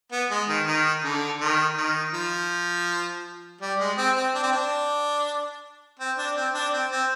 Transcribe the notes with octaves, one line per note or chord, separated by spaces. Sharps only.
B3
G#3
D#3
D#3
D3
D#3
D#3
F3
G3
G#3
C4
C4
D4
C4
D4
C4
D4
C4
D4
C4
C4